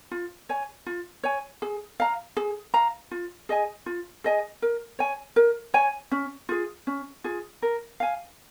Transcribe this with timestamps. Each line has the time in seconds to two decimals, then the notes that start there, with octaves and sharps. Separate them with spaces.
0.11 F4
0.49 C#5 G#5
0.86 F4
1.23 C#5 G#5
1.62 G#4
2.00 F5 A#5
2.37 G#4
2.74 F5 A#5
3.11 F4
3.49 G#4 D#5 G#5
3.86 F4
4.24 G#4 D#5 G#5
4.62 A#4
4.99 C#5 G#5
5.36 A#4
5.74 C#5 G#5
6.12 C#4
6.49 F4 G#4
6.87 C#4
7.24 F4 G#4
7.62 A#4
8.00 F5 G#5